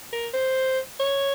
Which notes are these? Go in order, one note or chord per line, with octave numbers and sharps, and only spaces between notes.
A#4
C5
C#5